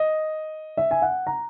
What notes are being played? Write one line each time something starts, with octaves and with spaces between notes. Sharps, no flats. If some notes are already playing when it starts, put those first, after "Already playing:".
Already playing: D#5
E5
G#5
F#5
A#5